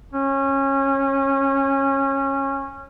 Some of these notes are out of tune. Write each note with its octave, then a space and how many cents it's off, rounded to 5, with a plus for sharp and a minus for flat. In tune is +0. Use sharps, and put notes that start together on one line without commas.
C#4 -20